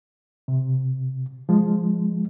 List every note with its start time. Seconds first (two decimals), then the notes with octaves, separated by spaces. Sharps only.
0.48 C3
1.49 F3 G#3